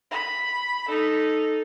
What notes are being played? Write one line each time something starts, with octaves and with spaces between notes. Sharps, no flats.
B5
D#4 A4